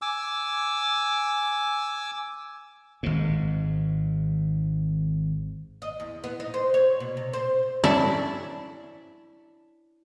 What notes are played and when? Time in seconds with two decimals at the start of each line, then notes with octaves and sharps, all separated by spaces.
0.02 G#5 D6 E6
3.03 G#1 G#2
5.82 D#5
6.00 E2
6.24 B3
6.40 D#4
6.54 C5
6.74 C#5
7.00 B2
7.17 C3
7.33 C5
7.84 C#4 D4 E4 D5 E5